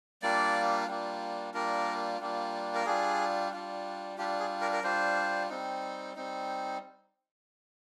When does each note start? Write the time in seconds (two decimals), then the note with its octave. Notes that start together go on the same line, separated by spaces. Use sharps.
0.22 G3 A#3 D4 F4 D5
0.88 G3 A#3 D4 F4
1.54 G3 A#3 D4 F4 A#4
2.20 G3 A#3 D4 F4
2.75 A#4
2.86 G3 D4 F4 G#4
3.52 G3 D4 F4
4.18 G3 D4 F4 G4
4.40 G#4
4.61 A#4
4.73 A#4
4.83 G3 D4 F4 C5
5.49 G3 C4 D#4
6.15 G3 C4 D#4